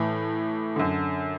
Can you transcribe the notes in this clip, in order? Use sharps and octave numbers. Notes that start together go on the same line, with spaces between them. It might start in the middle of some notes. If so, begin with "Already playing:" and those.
Already playing: A2 E3
F#2 D3